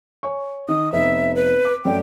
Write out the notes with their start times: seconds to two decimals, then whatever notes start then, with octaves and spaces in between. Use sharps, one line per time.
0.23 C#5 G#5 C#6
0.69 D#3 D#6
0.92 F1 B3 D#4 E5
1.36 B4
1.65 D6
1.85 F#2 A3 D5 G5